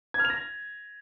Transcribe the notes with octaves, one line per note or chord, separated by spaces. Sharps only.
G#6
F6
F7
A#6